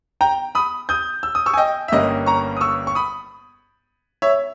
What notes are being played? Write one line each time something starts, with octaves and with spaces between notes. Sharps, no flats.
G5 A#5
B5 D#6
D#6 G6
E6
D#6
C#6 E6
G#5
D#5 G5
E5
G1 G2 G3 A#3 C#4 D#5
A#5 C#6
D#6
C#6 E6
C#6
B5 D#6
C#5 E5